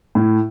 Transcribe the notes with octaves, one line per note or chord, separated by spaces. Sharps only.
A2